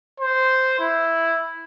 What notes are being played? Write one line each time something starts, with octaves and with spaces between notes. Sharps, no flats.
C5
E4